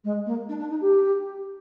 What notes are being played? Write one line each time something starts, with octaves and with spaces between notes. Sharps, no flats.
G#3
A#3
D4
D4
D#4
G4